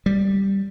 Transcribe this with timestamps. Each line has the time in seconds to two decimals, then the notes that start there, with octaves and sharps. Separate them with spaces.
0.06 G3